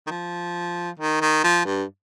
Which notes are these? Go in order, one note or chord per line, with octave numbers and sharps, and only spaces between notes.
D#3
F3
D#3
D#3
F3
G2